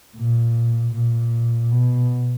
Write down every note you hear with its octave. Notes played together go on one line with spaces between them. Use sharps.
A#2
A#2
B2